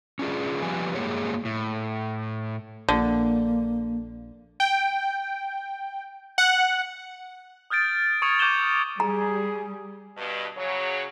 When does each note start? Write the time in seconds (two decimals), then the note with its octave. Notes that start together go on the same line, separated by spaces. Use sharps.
0.19 C#4 D4 F4 G#4
0.62 F3 G3 B3 G#5
0.95 G2 G#3 A#3 G#4 C#5
1.45 A2
2.89 A#1 D3 A#3
4.60 G5
6.38 F#5
7.70 D#6 F6 G6 A6 D7
8.22 C#6 D#6 G#6 C#7 F7
8.39 C#6 D6 G6 D#7 E7 G7
9.00 G3 G#4 A#5
10.16 G2 B2
10.56 C#3 F#3 C#5